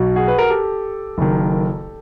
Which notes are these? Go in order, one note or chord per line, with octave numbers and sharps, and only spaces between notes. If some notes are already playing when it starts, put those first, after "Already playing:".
Already playing: B1 B2 F#3
F#4 G#4
B4
A#4
G4 A4
F#1 F#2 D#3